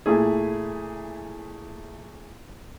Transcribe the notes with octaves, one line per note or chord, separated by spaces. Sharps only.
A#2 A3 E4 G#4